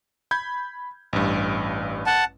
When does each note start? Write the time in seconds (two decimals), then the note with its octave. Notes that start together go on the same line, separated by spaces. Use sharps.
0.31 B5 G6 G#6
1.13 A1 G2
2.06 F#5 A5